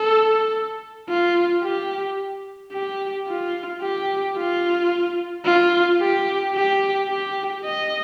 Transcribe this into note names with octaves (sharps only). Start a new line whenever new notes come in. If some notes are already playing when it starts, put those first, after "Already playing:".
Already playing: A4
F4
G4
G4
F4
G4
F4
F4
G4
G4
G4
D#5